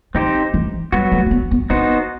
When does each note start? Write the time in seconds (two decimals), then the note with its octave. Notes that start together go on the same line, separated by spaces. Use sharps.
0.14 D#3 C4 D#4 G4 C5
0.54 E3
0.92 F#3 G3 B3 F#4
1.12 A3
1.26 C4
1.31 B3
1.51 B3
1.70 B3 C4 D#4 F#4 C5